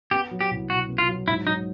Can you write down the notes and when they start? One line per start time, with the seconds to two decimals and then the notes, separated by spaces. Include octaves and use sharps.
0.11 B3 G4
0.31 F#3
0.41 G4
0.51 C2
0.70 B2 F#4
0.89 B3
0.98 F4
1.08 F#3
1.28 G#2 E4
1.46 F#3 D#4